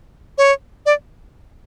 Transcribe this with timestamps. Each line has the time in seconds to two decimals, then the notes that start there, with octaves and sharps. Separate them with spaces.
0.38 C#5
0.86 D5